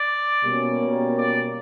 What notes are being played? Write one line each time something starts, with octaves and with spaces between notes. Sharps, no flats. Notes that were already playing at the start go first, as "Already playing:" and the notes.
Already playing: D5
B2 G3 A#3 C#4
D5